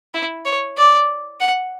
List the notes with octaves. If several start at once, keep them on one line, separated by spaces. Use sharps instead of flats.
E4
C#5
D5
F#5